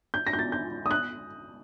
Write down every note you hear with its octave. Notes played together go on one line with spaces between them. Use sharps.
G6
A#6
G6
A6
G6
D#6
F#6